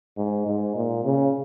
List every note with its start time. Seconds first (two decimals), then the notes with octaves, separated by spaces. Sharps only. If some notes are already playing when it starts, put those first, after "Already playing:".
0.17 G#2
0.47 G#2
0.75 A#2
1.04 C#3